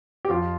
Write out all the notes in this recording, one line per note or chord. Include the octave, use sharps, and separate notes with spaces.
G4
F2 F4